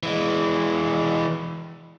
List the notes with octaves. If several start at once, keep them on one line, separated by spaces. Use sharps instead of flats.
E3 G#3